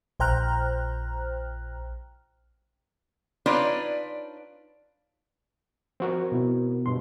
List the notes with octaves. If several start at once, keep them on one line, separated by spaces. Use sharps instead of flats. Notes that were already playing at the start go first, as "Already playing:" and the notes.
A#1 C5 G5 A#5 F6 F#6
D4 D#4 F4 B4 C#5 D5
F3 C4 F#4 A#4
B2 B3 E4
G2 B2 C6